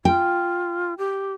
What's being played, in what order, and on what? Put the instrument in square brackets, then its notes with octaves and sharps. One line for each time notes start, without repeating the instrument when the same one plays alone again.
[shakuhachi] F4 [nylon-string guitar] G5
[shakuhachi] G4